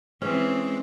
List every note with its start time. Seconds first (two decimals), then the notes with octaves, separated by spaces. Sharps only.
0.22 E3 G#3 C4 C#4